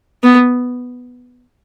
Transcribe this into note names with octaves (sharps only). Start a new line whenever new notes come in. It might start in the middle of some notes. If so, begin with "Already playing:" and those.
B3